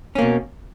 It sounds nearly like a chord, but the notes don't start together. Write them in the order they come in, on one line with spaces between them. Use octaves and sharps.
C#4 A#3 B2